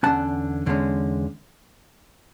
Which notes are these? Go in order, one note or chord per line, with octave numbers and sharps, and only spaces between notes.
E2 D3 G#3 C#4 F#5 A5
E2 D3 G#3 C#4